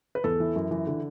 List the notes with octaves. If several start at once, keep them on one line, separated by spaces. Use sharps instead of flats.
B4
E2 A4
E3
F#2
E3
D3